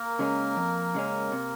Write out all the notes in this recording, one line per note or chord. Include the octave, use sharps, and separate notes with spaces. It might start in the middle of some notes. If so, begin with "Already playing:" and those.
Already playing: A#3 A#4
C#3 G#3 C#4
F2
C#3 G#3 C#4
C3